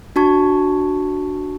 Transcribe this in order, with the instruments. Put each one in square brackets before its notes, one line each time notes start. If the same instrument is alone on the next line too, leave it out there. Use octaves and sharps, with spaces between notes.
[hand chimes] D4 F#4 A5 C#6 G#6